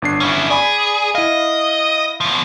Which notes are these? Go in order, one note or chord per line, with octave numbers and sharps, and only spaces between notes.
G1 D4 C7
C#4 E4
G#4 D5 G#5 B5
E4 D#5 F5
B2 F3